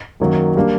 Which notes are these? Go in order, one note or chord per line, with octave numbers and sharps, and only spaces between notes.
F#2 D#3 F#3 A#3
G3 A#3 D4